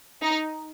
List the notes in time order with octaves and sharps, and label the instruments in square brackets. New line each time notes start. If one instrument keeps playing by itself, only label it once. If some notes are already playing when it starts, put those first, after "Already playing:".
[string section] D#4